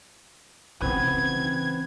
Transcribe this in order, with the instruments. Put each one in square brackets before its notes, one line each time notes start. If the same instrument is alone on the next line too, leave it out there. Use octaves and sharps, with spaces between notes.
[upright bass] C#3 E3 [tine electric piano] B3 C4 B4 [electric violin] G#6